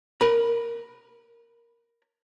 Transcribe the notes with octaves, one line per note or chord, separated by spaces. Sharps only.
A#4 B5